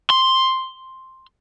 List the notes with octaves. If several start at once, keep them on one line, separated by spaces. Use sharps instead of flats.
C6